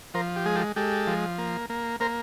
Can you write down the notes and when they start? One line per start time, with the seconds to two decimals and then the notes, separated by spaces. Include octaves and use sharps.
0.14 F3 A#4 C5
0.36 G4
0.46 G#3 G#4
0.56 G4 A4
0.76 G#3 G4 A4
1.07 F3
1.38 A#3
1.70 A#3
2.00 A#3 A#4 C5